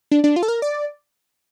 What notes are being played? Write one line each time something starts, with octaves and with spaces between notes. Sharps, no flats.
D4
D4
F4
A4
A#4
D5